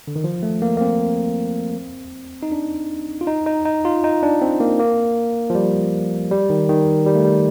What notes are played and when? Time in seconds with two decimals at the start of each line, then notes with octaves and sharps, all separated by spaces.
0.07 D3
0.16 D#3
0.24 F3
0.43 A3
0.62 A#3
0.77 A#3
0.81 C4
2.43 D#4
2.52 D4
3.21 F4
3.27 D#4
3.46 D#4
3.65 D#4
3.85 F4
4.04 D#4
4.23 D4
4.42 C4
4.60 A#3
4.79 A#3
5.50 F3
5.55 G3
6.31 G3
6.50 D#3
6.69 D#3
7.06 G3
7.15 A3
7.25 G3